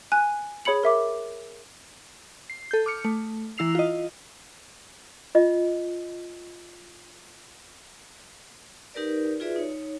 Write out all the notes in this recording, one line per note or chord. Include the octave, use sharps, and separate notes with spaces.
G#5 F#6
G#4 C#5 B5 C#7 F#7
A#4 E5 D6
C7
A4 G6
D6 F6 C#7
A3
E3 E4 E6 C7 F7
F4 D#5
F4 D#5
D#4 G4 A#4 B4 D5
F4 F#4 G#4 B4 D5 E5
D#4 C#5